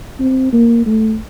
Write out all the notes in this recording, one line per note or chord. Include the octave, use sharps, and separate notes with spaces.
C4
A#3
A3